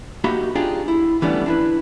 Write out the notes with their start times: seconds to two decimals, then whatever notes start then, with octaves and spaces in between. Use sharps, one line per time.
0.24 A#3 D#4 F#4 G4 E5 B5
0.55 D4 D#4 F4 G4 G#4
0.88 E4
1.22 E3 G3 A3 B3 C#4 D4
1.46 D4 E4 B4